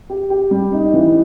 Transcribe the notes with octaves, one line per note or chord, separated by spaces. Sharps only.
G4
G4
G3
D#4
E3